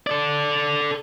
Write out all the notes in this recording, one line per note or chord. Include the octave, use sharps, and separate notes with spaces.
A4 D5